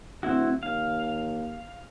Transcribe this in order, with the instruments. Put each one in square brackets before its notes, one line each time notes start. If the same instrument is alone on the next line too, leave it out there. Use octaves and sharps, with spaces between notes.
[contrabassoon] D1 [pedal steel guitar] C4 E4 F#4
[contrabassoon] D#2 [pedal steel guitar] F5